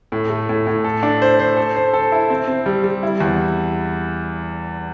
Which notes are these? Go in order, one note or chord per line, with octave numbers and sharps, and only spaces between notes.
A2
A3
A2
A2
A4
D4
C5
C5
A4
C5
A4
E4
C4
C4
G3
G3
E4
E2